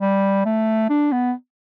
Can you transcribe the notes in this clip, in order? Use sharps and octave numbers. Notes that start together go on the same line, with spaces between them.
G3
A3
D4
B3